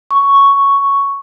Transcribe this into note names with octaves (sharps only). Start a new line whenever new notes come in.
C#6